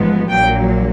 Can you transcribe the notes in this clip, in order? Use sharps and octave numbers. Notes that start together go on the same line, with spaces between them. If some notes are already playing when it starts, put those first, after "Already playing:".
Already playing: A1 G#2 F3 G#3 B3
A#1 A#2 F#3 A#3 G5